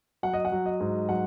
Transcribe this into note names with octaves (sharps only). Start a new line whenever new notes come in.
F#3 F#5
D#5
F#5
F#3
D#5
G#2
F#3 F#5